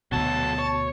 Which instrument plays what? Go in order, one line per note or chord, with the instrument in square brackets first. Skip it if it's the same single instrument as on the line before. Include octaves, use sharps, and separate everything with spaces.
[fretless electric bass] D2 B2 [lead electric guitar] F#3 A4 [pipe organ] A5
[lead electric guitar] C#5